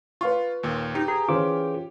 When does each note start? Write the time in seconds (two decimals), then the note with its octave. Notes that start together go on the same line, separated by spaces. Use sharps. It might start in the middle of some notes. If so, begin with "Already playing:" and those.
0.21 F4 B4 F5 C#6
0.63 D#2 A#2
0.95 D#4 G4
1.08 G#4 A#5
1.29 E3 C#4 F4 C5 D6